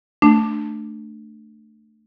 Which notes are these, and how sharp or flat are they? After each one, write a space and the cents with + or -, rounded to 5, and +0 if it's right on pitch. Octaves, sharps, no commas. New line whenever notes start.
A3 +5 D4 +15